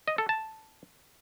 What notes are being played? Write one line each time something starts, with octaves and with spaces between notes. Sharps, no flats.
D#5
A4
A5